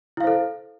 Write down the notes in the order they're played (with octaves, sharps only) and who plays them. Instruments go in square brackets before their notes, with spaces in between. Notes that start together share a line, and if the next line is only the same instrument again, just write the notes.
[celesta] E4
F5
C5
A4